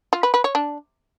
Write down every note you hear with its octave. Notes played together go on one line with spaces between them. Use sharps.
F4
B4
B4
C#5
D4